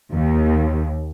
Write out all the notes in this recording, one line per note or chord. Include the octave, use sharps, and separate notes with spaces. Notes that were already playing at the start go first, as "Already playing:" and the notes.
D#2